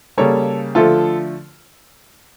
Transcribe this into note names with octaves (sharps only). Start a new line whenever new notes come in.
C#3 G3 A#3 A4 C#5
D3 F3 A3 F4 A4